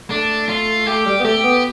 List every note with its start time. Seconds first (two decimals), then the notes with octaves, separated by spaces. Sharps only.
0.10 A3 D4
0.49 F4
0.86 A3 G4
1.06 G3
1.20 B3
1.24 A3 G4
1.43 B3